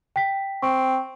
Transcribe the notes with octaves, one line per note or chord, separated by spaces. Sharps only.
G5 B6
C4 C#6